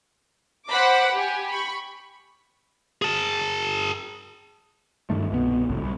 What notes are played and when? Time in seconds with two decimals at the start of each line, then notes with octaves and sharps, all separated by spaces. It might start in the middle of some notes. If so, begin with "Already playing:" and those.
0.68 C5 F#5 B5 D6
1.13 G4 G#5
1.49 B5 C#6
3.02 G#4 A5
5.10 G2 D#3 A3
5.31 C2 B2 D3 B3
5.69 G#1 C#2 A2
5.81 C2